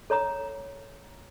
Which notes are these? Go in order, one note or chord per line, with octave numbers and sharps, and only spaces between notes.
A4 C#5 A#5 D#6